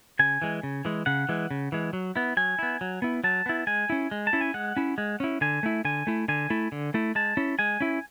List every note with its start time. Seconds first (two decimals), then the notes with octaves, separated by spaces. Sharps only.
0.19 C#3 G#5
0.42 E3 G#3
0.63 C#3
0.85 E3 G#3
1.06 C#3 F#5
1.29 E3 G#3
1.51 C#3
1.72 E3 G#3
1.93 F#3
2.16 B3 E4
2.37 F#3 G#5
2.59 B3 E4
2.81 F#3
3.02 B3 E4
3.24 F#3 A5
3.46 B3 E4
3.67 G#3 G#5
3.90 C#4 E4
4.11 G#3
4.27 A5
4.33 C#4 E4
4.41 G#5
4.54 G#3 F#5
4.77 C#4 E4
4.98 G#3
5.20 C#4 E4
5.41 D3 G#5
5.63 A3 E4
5.85 D3 G#5
6.07 A3 E4
6.28 D3 G#5
6.50 A3 E4
6.72 D3
6.94 A3 E4
7.15 G#3 A5
7.37 C#4 E4
7.59 G#3 G#5
7.81 C#4 E4